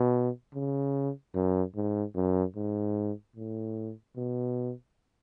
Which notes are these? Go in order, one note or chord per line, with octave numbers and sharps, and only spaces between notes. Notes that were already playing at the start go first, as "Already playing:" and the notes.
Already playing: B2
C#3
F#2
G#2
F#2
G#2
A2
B2